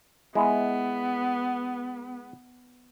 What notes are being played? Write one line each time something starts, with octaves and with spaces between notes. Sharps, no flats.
G#3 B3 E4